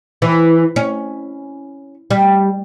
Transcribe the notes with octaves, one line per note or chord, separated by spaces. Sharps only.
E3
C#4
G3